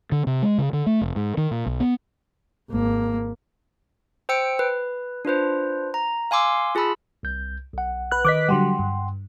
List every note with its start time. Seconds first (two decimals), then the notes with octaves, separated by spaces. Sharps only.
0.12 D3
0.27 C3
0.43 G#3
0.58 C#3
0.73 D3
0.86 A3
1.01 F1
1.16 G#2
1.37 D#3
1.51 A#2
1.66 B1
1.80 B3
2.70 G#1 A#3
4.29 C5 G5 E6 C#7 D7
4.59 B4
5.25 D4 F4 B4 C5
5.94 A#5
6.31 F5 G#5 C6 D6 E6
6.75 F4 G#4 A5 B5 E6
7.23 C2 G6
7.73 B1 F#5
8.11 B4 F#6
8.25 D#3 B4 D#5 D6 F#6 B6
8.49 D3 F#3 G3 F#5 G5 C6
8.79 G2